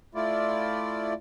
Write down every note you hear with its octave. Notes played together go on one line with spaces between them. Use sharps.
A3 E4 F4 D5